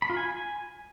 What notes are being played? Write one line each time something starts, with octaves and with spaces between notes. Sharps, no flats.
B5
F4
G#5